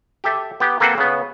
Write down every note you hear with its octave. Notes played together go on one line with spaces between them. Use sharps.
G4 A4 E5
B3 G4
A#3 C4 A4 B4 C5 F#5
C#3 B3